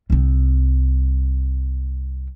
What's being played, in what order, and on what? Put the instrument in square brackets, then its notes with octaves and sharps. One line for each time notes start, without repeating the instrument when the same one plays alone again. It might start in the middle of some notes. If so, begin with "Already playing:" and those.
[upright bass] C2 C4